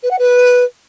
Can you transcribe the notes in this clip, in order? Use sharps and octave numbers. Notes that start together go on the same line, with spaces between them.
B4
F#5
B4